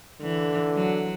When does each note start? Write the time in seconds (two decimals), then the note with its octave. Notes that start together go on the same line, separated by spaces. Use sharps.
0.22 D3 E3
0.74 F#3